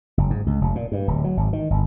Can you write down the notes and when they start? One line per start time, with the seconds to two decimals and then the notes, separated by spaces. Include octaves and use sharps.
0.17 F#1
0.30 G#2
0.46 C#2
0.61 F1
0.75 A#2
0.92 G2
1.08 D1
1.24 F#3
1.37 G#1
1.53 D#3
1.70 G1